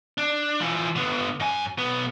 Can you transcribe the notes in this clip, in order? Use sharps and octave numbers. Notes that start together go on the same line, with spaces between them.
D4
E3 F3
D3 B3
F#2 G#5
B1 B3